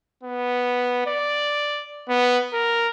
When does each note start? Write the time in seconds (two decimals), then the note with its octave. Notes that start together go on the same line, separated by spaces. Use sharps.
0.23 B3
1.06 D5
2.09 B3
2.53 A#4